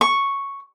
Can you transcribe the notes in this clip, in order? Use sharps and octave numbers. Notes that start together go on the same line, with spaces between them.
C#6